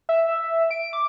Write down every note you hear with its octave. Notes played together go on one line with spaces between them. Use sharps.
E5
D7
D6